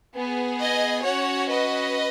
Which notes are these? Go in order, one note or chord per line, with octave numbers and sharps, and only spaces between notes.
B3 G#4
D#5 G#5
C#4 F#4 C#5 F#5
B4 D#5